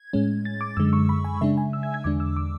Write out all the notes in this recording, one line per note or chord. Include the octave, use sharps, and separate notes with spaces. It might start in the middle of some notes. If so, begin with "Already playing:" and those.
Already playing: G#6
A2 G#3 C#4
A6
D6
F#2 D3 G#3 E6
C#6
B5
G#5
C#3 G#3 D4 E5
G#5
E6
G#6
G#6
E2 D3 G#3 D4 D6
E6
D6